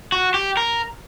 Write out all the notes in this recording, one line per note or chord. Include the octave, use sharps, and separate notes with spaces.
F#4
G4
A#4